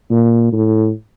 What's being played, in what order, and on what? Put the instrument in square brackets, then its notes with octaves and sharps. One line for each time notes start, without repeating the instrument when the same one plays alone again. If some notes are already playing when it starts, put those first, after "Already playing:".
[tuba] A#2
A2